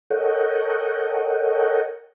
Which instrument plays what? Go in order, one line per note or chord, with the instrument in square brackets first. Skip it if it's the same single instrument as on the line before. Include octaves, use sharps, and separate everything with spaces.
[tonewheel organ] A4 A#4 C#5 D#5 F#5 G5